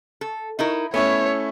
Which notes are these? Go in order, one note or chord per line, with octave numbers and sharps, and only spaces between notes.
A4
D#4 E4 A#4
A3 B3 C#4 E4 C#5